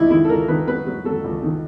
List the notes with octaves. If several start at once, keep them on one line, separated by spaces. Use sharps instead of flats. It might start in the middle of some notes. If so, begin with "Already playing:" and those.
Already playing: C#2 D#4 E4
D#3 E4
A4
C#2 A#4
D#3 B4
F#3 B4
F#3
F#3 A4
C#2
D#3